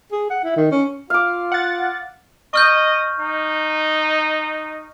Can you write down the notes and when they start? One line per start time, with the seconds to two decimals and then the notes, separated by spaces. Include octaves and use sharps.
0.12 G#4
0.31 F#5
0.44 E4
0.56 D#3
0.72 C#4
1.10 F4 F5 D6
1.52 F#5 A6
2.54 D#5 C#6 F6 G6
3.20 D#4